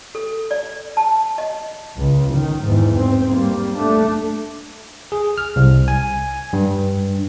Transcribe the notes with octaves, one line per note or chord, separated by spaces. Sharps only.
A4
D5
A5
D#5
C#2
D#3
E2 G#2
G#2 C4
G3 A#3
A3 D4
G#4
F6
C2
G#5
G2